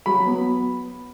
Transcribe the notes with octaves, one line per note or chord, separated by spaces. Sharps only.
F#3 B5
B3